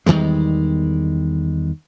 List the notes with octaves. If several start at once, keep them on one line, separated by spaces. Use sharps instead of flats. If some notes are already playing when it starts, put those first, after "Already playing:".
E2 D#3 G3 G#3